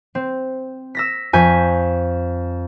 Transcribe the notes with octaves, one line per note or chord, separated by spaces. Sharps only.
C4
E6 A#6 B6
F2 G#5 C#6 G6 B6